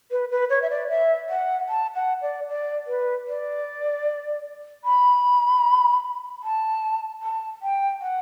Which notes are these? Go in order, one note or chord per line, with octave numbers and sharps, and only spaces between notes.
B4
B4
C#5
E5
D5
E5
F#5
A5
F#5
D5
D5
B4
D5
B5
A5
A5
G5
F#5